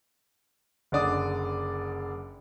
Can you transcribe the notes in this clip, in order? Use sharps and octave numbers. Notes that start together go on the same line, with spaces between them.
F#1 D3 D5 D#6